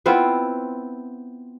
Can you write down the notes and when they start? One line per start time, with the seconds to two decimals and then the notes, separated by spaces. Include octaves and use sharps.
0.06 B3 C4 E4 F4